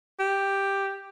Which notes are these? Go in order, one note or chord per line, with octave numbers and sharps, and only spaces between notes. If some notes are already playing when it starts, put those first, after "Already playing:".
G4